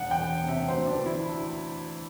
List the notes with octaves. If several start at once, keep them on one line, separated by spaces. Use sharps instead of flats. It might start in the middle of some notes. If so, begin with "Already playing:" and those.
Already playing: E1 F#5
G5
E1
C3
E5
D2 C5
D4
E3
E4